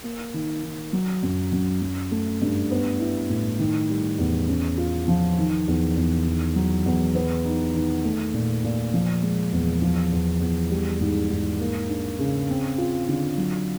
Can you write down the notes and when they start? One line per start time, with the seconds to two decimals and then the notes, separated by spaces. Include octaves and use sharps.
0.03 A#3
0.34 D#3
0.63 D#3
0.93 F#3
1.23 F#2
1.52 F#2
1.82 F#3
2.11 A3
2.42 G2
2.71 B3
3.00 E4
3.30 A2
3.59 D#3
3.90 G3
4.19 E2
4.49 C#4
4.78 F4
5.08 F3
5.38 D#3
5.68 E2
5.97 E2
6.27 D#3
6.56 F#3
6.86 E2
7.15 B3
7.45 D#4
7.75 D#3
8.05 A3
8.34 A#2
8.64 A#2
8.94 F3
9.23 G#3
9.53 E2
9.82 F3
10.12 E2
10.41 E2
10.70 G3
11.01 G#2
11.30 G#2
11.60 A#3
11.89 D4
12.19 C#3
12.49 C4
12.78 F4
13.09 D3
13.38 F#3